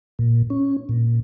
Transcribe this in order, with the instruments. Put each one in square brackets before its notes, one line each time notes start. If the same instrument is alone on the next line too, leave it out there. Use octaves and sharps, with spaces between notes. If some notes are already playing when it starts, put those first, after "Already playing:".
[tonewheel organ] A#2
C#4
A#2